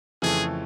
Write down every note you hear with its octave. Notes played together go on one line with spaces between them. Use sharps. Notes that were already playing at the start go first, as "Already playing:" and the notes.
F2 C#3 E3 A3 C4 G#4